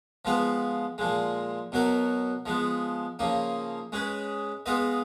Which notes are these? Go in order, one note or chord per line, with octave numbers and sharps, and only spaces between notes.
F3 G#3 B3 F4 B4
A#2 F3 G#3
B2 F#3 B3 F#4 A#4
F3 G#3 B3
C#3 F3 A#3 D#4
G#3 C#4 G#4 B4
G#3 B3 F4 B4 D#5